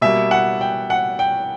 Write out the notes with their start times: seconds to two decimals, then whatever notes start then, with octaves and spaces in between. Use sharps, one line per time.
0.01 B2 G3 A#3 E5
0.31 F#5
0.61 G5
0.90 F#5
1.19 G5